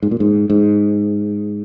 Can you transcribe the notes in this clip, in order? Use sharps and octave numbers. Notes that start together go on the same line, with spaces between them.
G#2
A#2
G#2
G#2